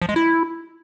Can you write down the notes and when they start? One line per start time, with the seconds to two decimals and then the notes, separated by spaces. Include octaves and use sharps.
0.02 F3
0.09 G#3
0.16 E4